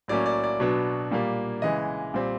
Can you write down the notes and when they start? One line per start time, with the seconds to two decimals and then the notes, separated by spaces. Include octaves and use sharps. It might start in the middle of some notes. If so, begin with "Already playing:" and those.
0.08 A2 F#3 A#3 C#4 D5
0.26 D5
0.44 D5
0.60 B2 F#3 B3 D4
1.11 A#2 G3 A#3
1.62 C#3 E3 G#3 D#5
2.14 A#2 G3 C4